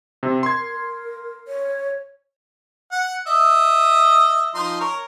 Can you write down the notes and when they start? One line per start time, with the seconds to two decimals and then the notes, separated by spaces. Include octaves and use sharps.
0.23 C3
0.43 A#4 C6 G#6
1.48 C#5
2.92 F#5
3.27 D#5 E5 D#6
4.55 F3 D#4 C6
4.80 A#4 C#5